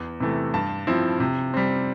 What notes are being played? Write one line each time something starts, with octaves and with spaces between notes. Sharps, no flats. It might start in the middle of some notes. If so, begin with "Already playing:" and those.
Already playing: E2
C3 E3 A3
G2 A5
F3 C4 E4
C3
G3 C4